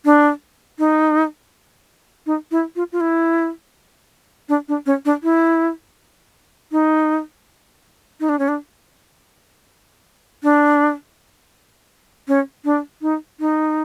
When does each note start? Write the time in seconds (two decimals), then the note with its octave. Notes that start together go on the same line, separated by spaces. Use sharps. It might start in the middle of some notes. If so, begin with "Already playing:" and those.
0.05 D4
0.79 D#4
2.26 D#4
2.51 E4
2.76 F4
2.92 F4
3.01 E4
4.49 D4
4.68 D4
4.86 C#4
5.05 D4
5.23 E4
6.72 D#4
8.20 D#4
8.29 D4
8.39 C#4
8.48 D4
10.43 D4
12.28 C#4
12.65 D4
13.02 D#4
13.40 D#4